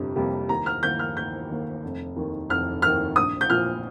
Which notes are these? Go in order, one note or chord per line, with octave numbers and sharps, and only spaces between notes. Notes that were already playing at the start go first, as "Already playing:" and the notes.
Already playing: G1 F2 C3 G3
F2 C3 G3 A#3
D#2 A#5
F6
D#3 A#3 G6
F6
D#2 G6
D#3 A#3
F1
D#2 D#3
F1 F6
D#2 D#3 F6
A#1 D#6
G6
A#2 F3 F6